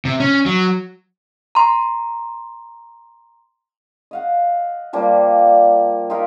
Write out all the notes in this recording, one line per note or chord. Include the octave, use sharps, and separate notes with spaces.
C3
C#4
F#3
A#5 C6
D#5 F5 F#5
F3 G3 A#3 D4
D#4 F4 G4 A#4